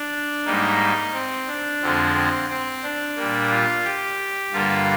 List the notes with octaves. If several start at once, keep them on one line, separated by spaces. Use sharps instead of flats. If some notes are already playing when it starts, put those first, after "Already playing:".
Already playing: D4
G#2 G3 A#3 D#4
C4
D4
F2 D3 F3 G#3 C4
C4
C4
D4
A#2 G3 A#3
F4
G4
G2 D3 G3 A#3 F4